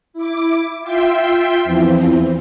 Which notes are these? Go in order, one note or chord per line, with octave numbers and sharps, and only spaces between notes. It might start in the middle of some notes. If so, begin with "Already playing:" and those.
E4 D6
F4 E5 G5 C6
E2 E3 F3 C4